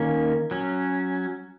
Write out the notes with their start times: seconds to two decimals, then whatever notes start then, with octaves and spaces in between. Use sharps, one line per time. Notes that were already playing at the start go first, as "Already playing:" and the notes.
Already playing: D#3 A#3 C#4
0.51 F#3 C#4